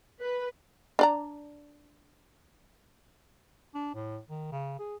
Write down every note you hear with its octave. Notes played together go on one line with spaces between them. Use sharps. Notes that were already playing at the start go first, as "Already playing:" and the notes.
B4
D4 D5 A#5
D4
A2
D#3
C#3
G#4